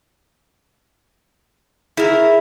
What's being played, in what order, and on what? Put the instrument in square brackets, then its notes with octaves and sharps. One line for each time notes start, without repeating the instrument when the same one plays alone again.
[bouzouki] C#3 A#4 [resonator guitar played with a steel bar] E4